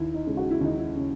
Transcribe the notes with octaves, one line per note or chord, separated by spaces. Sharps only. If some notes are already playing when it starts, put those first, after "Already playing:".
Already playing: D#2 E4
D#4
C#3 G#3
F#4
E4
D#2 D#4
E4
C#3